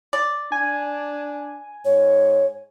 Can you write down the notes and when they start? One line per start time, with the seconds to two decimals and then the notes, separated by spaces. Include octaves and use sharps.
0.13 D5
0.52 D4 G#5
1.85 G#2 C#5